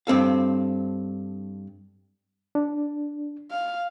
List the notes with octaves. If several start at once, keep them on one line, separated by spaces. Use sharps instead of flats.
G2 C4 A4 F5
D4
F5